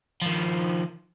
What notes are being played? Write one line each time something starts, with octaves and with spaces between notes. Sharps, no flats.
D#3 F3